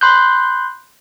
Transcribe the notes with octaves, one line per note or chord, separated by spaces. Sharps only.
B5 C6 F#6 G6